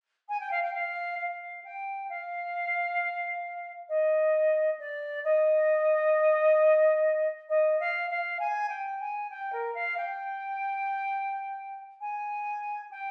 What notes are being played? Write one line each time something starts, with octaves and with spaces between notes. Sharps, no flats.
G#5
G5
F5
G5
F5
F5
G5
F5
D#5
D5
D#5
D#5
F5
F5
G#5
G5
G#5
G5
A#4
F5
G5
G#5
G5